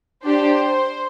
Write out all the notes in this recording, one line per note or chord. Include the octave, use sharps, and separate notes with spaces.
D4 G4 C5